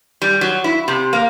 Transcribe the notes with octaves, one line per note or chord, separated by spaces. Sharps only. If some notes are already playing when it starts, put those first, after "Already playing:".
G3
F#3
E4
C3
A#3